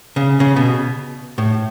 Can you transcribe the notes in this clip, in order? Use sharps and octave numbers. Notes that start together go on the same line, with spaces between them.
C#3
C#3
B2
A2